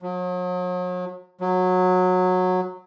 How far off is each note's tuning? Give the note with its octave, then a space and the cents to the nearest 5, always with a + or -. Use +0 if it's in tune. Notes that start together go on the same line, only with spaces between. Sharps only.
F#3 -40
F#3 -15